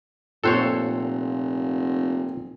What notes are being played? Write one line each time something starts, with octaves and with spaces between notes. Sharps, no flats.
F1 A#2 A4 C5 C#5 G5 F#6